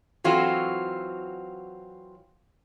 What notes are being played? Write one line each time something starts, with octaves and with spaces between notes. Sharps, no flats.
E3 F#3 C4 F4 F#4 A4